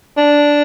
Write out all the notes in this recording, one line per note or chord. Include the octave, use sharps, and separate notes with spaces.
D4